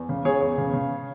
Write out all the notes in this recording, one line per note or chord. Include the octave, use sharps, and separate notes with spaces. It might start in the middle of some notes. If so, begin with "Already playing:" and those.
Already playing: E2
C#3
C#3 G#4 C#5
E2
C#3
C#3